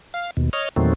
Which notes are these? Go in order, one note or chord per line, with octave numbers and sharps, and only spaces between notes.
F5
D#2 B2
C#5 D#5 F6
E2 A#2 D#3 F#3 A3 C4